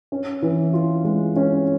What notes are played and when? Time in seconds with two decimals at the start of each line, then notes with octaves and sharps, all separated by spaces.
0.12 C#4
0.42 E3
0.73 F4
1.05 G#3
1.36 C#4